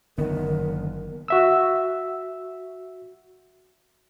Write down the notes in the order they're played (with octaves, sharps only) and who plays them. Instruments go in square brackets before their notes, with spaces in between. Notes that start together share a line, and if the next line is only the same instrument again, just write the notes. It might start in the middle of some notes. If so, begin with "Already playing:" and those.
[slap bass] F#1 B3 [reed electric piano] D3 D#3 [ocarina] A#4
[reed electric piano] F#4 E5 E6